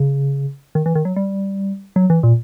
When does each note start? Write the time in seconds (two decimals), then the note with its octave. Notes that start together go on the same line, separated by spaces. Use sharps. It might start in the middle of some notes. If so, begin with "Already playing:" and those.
Already playing: C#3
0.75 D#3
0.86 E3
0.95 D#3
1.05 F#3
1.16 G3
1.96 F#3
2.10 E3
2.23 A#2